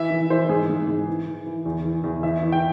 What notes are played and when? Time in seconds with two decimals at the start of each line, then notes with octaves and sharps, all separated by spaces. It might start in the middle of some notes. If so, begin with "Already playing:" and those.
Already playing: E3 E5
0.10 E3
0.30 E3 C5
0.49 G#2 G#4
0.69 G#2
0.88 G#2
1.08 E3
1.27 E3
1.46 E3
1.66 E2
1.85 E3
2.04 E2
2.23 E3 E5
2.43 E3
2.52 G5